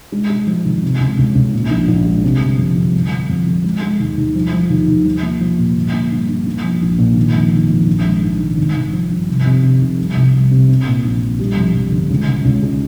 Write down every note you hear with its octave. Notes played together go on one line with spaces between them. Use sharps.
G#3
G#3
F3
G#1
C3
C#2
C#2
C#2
A#2
A#1
A#1
G#3
C3
G1
F2
F2
G1
G1
F2
F2
G#3
G#3
D#2
D#2
F3
F3
D#2
D#2
F3
A#3
F3
A#2
G1
A#3
G2
G2
A#3
F3
A#1
A#2
D#3
F2
D#3
F2
A#1
G#3
G#2
D#3
G#1
G#1
F3
G2
F1
C3
C3
F1
G3
C2
G3
C3
C4
A#2
A#1
A#1
G3
F2
F2
G1
C#2
C#3
C#2
G#3